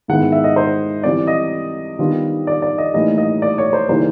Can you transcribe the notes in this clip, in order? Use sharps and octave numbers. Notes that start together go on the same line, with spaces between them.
G#2 D#3 G#3 B3 E4 F#5
E5
D#5
C5
E3 G3 C4 D5
D#5
D#3 G3 B3 D4 F4
D5
D5
D#5
A2 E3 G3 A#3 D#4 D#5
D#5
D5
C#5
C5
C#3 E3 G3 A#3 D#4 C5